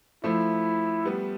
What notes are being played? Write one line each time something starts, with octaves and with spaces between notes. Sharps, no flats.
F3 A3 E4
G3 B3